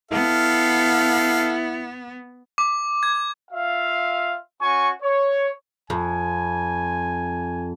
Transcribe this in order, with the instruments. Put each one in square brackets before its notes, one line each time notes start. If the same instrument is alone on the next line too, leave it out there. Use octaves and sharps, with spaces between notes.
[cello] B3 [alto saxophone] E4 [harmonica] A4 F5
[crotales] D6
G#6
[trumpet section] F4 E5 F5
C#4 F#4 G#5 C#6
C#5
[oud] F2 [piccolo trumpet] G#5